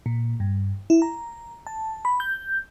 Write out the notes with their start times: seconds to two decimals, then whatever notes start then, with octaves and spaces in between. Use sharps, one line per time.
0.06 A#2
0.40 G2
0.90 E4
1.02 A#5
1.67 A5
2.05 B5
2.20 G6